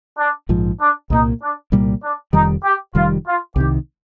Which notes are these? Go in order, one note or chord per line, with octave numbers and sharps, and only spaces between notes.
D4
A#1 G#2 F3
D4
C2 A#2 G3 A#3 D#4
D4
C2 A#2 G3 A#3
D4
F1 F2 D#3 G3 D#4
G4
F1 F2 D#3 G3 F4
F4
C2 C3 D#3 G4